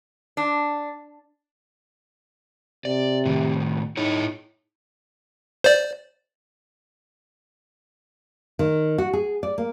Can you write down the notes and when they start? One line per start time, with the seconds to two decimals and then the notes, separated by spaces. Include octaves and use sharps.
0.37 D4
2.85 C3 D5
3.26 A2 D#3
3.97 D#4 E4 G#4 C#5
5.64 C5 D5
8.59 D#3
8.98 F#4
9.13 G#4
9.43 D5
9.58 A#3